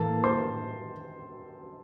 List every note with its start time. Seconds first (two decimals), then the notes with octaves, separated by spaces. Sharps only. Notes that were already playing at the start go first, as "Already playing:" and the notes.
Already playing: A2 E3 A#3 A4 A5
0.24 C5 C6